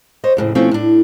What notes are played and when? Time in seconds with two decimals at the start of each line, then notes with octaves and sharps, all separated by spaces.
0.24 C5 C#5 D#5
0.37 F2 A2 C#3
0.55 B2 F3 A3 C4 C#4
0.71 A2 D4